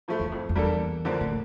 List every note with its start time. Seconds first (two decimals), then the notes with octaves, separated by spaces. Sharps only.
0.08 A2 F3 A3
0.20 E2
0.32 F2
0.49 F2
0.55 E2 G3 A#3 D4 A4
1.04 F2 D3 F3 A#3 D4
1.21 A2